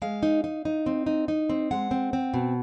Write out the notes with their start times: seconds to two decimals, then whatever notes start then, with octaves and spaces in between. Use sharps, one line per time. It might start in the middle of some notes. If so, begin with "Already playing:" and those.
0.02 G#3 F5
0.23 D#4
0.44 D#4
0.65 D#4
0.86 C4
1.06 D#4
1.28 D#4
1.49 C4
1.71 G#3 F#5
1.91 C4
2.13 C4
2.34 B2